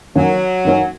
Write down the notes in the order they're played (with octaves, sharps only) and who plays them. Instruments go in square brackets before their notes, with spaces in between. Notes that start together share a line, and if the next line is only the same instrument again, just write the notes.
[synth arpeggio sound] F#2 D#3 A#3 C#4 [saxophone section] F#3
[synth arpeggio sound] F#2 D#3 A#3 C#4